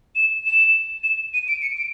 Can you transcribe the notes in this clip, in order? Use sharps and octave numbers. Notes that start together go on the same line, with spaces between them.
E7
E7
E7
D#7
D7
C#7
D7